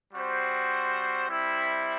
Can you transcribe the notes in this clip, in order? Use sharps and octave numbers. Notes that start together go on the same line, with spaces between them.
G3 C4 F#4 C5
G3 C4 E4